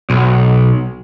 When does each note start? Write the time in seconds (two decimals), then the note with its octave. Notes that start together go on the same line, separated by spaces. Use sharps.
0.10 B1